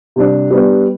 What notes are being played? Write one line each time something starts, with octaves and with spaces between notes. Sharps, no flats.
C3 G3 D4
G3 B3 D4